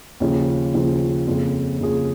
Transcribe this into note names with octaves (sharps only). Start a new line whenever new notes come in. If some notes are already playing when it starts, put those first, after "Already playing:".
D#2 C#3 F3
D#2 C#3 F3
F2 C#3 A#3 F4 G#4
F2 C#3 A#3 F4 G#4